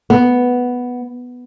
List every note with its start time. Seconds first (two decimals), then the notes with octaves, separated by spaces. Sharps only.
0.10 B3